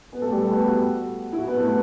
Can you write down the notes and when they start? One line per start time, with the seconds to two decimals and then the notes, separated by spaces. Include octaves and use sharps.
0.12 B3 B4
0.22 A3 A4
0.32 G3 G4
0.41 A3 A4
0.51 B3 B4
0.62 G4
0.66 F#4
1.33 E4
1.38 F#4
1.47 B3 B4
1.57 A3 A4
1.66 B3 B4